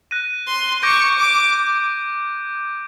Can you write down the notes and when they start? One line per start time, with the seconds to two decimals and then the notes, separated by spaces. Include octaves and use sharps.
0.11 F#6 A#6 D#7
0.47 C6
0.83 C#6 D6 G6 A#6 D7
1.19 D6